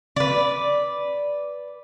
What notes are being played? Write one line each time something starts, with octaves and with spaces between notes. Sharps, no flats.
B4 D5